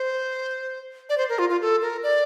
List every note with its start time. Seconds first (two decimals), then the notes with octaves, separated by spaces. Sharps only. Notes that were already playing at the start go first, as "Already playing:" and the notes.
Already playing: C5
1.09 D5
1.18 C5
1.29 A#4
1.39 F4
1.49 F4
1.61 A4
1.82 A#4
2.03 D5